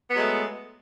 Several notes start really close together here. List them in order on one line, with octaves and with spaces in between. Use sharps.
B3 F#3 G#3 A3